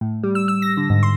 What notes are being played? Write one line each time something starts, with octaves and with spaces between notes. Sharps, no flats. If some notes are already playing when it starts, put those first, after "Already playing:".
A2
G3
E6
E6
A#6
D3
G#2
C6